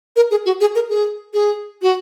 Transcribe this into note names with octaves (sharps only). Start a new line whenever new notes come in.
A#4
G#4
F#4
G#4
A#4
G#4
G#4
F#4